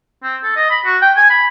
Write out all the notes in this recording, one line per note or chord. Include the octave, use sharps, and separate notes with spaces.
C4
A4
D#5
B5
F#4
G5
G#5
B5